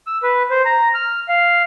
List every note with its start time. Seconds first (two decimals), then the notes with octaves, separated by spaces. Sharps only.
0.07 E6
0.23 B4
0.50 C5
0.65 A#5
0.95 F6
1.28 F5